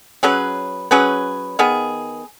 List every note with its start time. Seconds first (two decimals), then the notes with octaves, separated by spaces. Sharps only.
0.23 F#3 C#4 G#4 B4
0.91 F#3 C#4 G#4 B4
1.59 D#3 B3 G#4